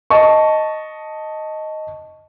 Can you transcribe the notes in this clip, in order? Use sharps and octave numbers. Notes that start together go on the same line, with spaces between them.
D#5 A5 C#6